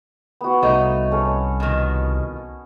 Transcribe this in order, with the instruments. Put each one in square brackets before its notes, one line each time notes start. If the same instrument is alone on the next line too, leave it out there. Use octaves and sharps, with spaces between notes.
[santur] B3 F#4
[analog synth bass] C2 [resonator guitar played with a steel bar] A3 D#4 [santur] C#5
[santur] C#4 A4
[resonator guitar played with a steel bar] B2 D#3